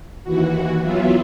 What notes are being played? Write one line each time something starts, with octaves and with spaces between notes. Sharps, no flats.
D#2 E3 F#4
E3 F#3 B3 E4 F4